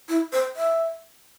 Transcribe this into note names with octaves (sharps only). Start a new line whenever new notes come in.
E4
C5
E5